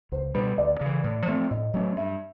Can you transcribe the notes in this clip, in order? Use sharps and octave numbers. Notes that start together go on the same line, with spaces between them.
C#2 C5
B2 G3 B4
D2 D5
C#3 E3
A2
F3 A3 C4
A2 D#5
F#3 A3 C#4
G2 E5